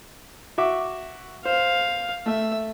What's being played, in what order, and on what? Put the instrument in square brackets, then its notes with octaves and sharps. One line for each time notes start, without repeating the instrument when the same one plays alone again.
[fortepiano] F#4 E5 D6
[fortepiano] C5 [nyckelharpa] F5
[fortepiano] A3 [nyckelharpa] E5